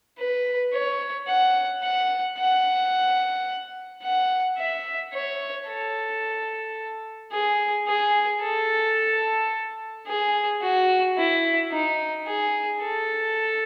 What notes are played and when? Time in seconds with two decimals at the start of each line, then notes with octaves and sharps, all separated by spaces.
0.18 B4
0.73 C#5
1.28 F#5
1.83 F#5
2.38 F#5
4.03 F#5
4.58 E5
5.13 C#5
5.68 A4
7.32 G#4
7.88 G#4
8.42 A4
10.07 G#4
10.62 F#4
11.17 E4
11.72 D#4
12.27 G#4
12.82 A4